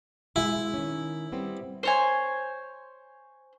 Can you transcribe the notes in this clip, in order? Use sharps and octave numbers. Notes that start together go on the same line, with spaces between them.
B2 G#3 E4 G#5
D#3 C#4
G3 B3 C4
C5 C#5 G#5